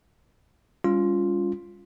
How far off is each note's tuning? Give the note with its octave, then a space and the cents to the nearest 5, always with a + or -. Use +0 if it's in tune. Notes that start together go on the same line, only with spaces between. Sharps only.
G3 +35 C#4 +25 F4 +0